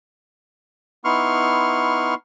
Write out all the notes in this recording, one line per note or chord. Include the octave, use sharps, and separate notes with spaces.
B3 D#4 E4 C6 C#6 F6